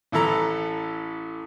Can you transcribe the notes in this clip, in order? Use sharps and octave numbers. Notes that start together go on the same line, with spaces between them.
A1 E3 E4 A4 A#5